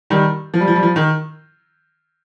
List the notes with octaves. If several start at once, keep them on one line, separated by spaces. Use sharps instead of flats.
D#3 G3
F3
G3
F3
G3
F3
D#3